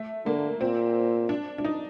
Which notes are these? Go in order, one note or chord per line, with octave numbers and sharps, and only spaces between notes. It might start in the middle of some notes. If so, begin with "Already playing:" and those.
Already playing: A3
D3 A#3
A#2 C4
D4
D4
D#4